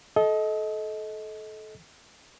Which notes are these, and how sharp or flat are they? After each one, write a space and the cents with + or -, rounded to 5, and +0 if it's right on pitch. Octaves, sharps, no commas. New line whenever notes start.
A4 -25 D#5 +20